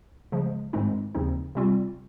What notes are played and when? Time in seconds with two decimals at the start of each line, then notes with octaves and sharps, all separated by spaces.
0.32 C#3 F3 G#3
0.73 G#2 D#3 G#3 C4 D#4
1.15 D#2 C#3 F3 C4 D#4
1.55 C3 G3 C4 F4